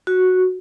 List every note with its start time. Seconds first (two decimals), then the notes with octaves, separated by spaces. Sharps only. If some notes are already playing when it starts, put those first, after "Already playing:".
0.07 F#4